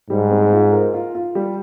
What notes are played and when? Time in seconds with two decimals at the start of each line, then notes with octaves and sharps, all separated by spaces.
0.10 G#2 G3
0.31 C4
0.52 F4
0.72 A#4
0.94 F4
1.15 F4
1.35 G3